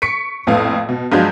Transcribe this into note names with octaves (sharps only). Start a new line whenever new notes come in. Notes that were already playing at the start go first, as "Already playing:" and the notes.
C#6 B6 C#7 D7
A#1 F2 A2 B3 F5
B2
G2 F3 F#3 G#3 G6